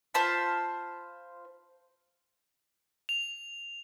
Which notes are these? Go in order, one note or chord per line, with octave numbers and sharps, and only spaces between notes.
F4 C5 A5 B5
F7